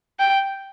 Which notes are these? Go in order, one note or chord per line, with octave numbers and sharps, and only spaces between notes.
G5